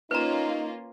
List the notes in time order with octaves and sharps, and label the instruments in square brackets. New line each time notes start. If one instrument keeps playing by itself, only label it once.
[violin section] A#3 C#4 F4 [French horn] D#4 [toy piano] B4 A#5